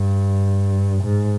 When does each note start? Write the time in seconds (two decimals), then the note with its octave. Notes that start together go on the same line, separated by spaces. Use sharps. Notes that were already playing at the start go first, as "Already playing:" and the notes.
Already playing: G2
1.03 G#2